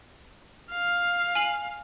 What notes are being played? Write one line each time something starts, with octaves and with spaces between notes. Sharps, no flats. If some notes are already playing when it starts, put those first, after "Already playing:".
F5
G#5 C7 F#7